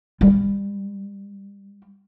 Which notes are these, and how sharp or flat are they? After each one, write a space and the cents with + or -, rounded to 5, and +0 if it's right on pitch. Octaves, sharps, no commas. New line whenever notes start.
G3 +30